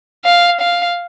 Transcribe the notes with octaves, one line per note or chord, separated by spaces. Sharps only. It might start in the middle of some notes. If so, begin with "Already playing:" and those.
F5
F5